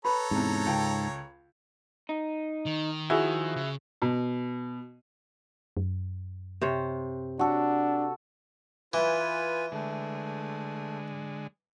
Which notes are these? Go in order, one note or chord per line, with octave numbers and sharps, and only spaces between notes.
A4 B4 C#5 A#5 B5
E2 G#2 C3
C#2 G5 A5
D#4
D#3
F3 E4 F#4 G#4
C#3
B2
F#2
C3 C5 C#5
D4 F#4 A4
E3 F4 B4 G#5
D3 G#3 A3